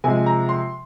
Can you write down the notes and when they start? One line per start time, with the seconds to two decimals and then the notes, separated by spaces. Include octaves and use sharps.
0.04 C3 F3 G#3 G#5
0.26 A#5
0.49 C6